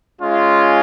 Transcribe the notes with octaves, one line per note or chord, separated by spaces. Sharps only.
G#3 C#4 F4